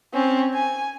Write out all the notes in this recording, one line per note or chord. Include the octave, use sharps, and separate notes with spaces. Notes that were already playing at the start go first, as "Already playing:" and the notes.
C4 C#4
G#5